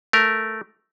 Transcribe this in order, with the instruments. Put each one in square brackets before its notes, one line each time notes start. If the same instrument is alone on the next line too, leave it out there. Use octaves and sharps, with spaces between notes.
[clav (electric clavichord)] A3 A#4